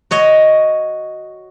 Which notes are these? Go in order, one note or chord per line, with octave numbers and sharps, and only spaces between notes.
F#4 C#5 D#5